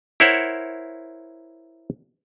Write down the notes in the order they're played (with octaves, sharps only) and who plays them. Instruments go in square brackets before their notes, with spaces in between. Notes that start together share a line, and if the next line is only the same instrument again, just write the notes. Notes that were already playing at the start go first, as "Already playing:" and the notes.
[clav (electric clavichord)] E4 A#4 C5 C#5 E5 F#5